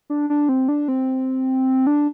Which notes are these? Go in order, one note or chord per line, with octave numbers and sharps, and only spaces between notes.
D4
D4
C4
D4
C4
D4